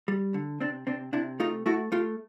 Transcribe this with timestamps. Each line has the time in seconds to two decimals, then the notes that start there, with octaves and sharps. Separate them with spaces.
0.08 G3
0.34 D3
0.60 C3 C4 D4
0.87 C3 C4 D4
1.13 C3 D4 E4
1.40 A3 D#4 F4
1.66 A3 E4 F#4
1.92 A3 F4 G4